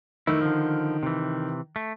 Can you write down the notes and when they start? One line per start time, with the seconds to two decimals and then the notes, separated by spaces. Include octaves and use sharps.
0.27 D#3 E3 A3 E4
0.41 D3 F3
1.03 C3 E3
1.76 A3